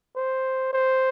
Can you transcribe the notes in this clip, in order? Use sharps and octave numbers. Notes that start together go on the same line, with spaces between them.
C5
C5